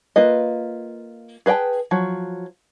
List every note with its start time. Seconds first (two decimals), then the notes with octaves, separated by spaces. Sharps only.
0.16 A#3 F4 B4 D#5
1.46 G#4 B4 D#5 G5 A5
1.91 F3 F#3